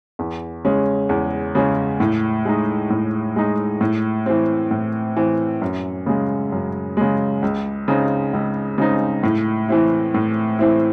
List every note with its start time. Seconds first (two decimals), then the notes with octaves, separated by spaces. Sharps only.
0.19 E2
0.65 C#3 G#3 C#4
1.09 E2
1.55 C#3 G#3 C#4
2.00 A2
2.45 G#3 D#4
2.90 A2
3.36 G#3 D#4
3.81 A2
4.26 E3 C4
4.71 A2
5.16 E3 C4
5.62 F#2
6.06 C#3 G#3
6.52 F#2
6.97 C#3 G#3
7.42 C#2
7.88 C#3 G#3 C4 D#4
8.33 C#2
8.78 C#3 G#3 C4 D#4
9.23 A2
9.68 E3 C4 E4
10.14 A2
10.59 E3 C4 E4